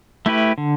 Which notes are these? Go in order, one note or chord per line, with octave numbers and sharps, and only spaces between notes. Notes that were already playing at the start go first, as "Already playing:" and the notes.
A3 E4 G4 B4
D3